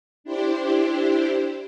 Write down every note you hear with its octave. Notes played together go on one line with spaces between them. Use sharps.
D4 E4 G4 C5